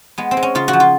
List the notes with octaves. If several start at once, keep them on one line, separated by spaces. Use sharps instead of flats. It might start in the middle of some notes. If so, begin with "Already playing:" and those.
G#3 B3
C4
G#3
C#4
C#3 F4
F#4
F3
F4